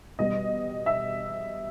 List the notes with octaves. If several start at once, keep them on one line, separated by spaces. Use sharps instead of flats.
B2 G3 B3 D#5
E5